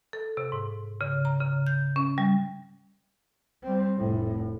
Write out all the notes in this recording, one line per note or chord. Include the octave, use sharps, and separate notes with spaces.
A4
C3
G#2
C#3
A#5
C#3
G6
C#4
G3
G3 C4
F1 A2